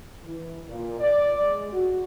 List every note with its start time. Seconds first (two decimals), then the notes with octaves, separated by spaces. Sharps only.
0.24 E3
0.68 A#2
0.99 D5
1.41 G#3
1.72 F#4